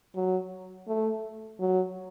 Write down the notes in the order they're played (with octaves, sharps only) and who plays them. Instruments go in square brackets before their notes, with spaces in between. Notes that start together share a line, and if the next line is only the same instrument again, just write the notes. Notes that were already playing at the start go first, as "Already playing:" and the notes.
[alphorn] F#3
A3
F#3